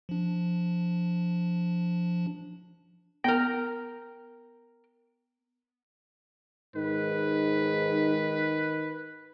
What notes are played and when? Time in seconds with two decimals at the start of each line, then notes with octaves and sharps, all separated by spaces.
0.09 F3 D4
3.24 B3 A#4 G5
6.75 G#2 D#3 B4